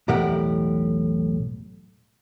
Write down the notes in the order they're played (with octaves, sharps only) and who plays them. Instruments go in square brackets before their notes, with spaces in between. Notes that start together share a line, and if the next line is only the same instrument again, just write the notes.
[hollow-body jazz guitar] B1 E2 A2 G4 A#4 F#5